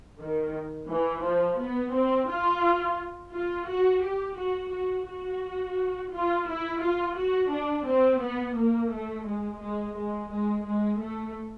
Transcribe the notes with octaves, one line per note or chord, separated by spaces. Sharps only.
D#3
E3
F3
B3
C4
F4
F4
F#4
G4
F#4
F#4
F#4
F4
E4
F4
F#4
D4
C4
B3
A#3
A3
G#3
G#3
G#3
G#3
G#3
A3